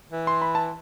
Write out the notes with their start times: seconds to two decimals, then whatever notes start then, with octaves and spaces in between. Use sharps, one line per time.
0.12 E3
0.27 C6
0.42 B5
0.55 A5